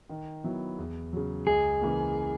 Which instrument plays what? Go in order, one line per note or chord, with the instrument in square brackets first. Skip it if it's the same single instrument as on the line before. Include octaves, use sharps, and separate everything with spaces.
[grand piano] D#3
F#3 B3 E4
E2
C#3 F#3
[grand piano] C#2 [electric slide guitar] G#4
[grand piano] C#3 E3 A#3